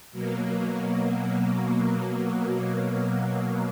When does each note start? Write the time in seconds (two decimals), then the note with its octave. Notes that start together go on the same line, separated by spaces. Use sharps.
0.12 B2 F#3 A#3